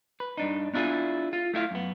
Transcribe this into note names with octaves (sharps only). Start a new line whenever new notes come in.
B4
G2 D4 D#4
B3 D4 E4 F4 G#4
F4
A3 E4 E5 F5
F#2 B3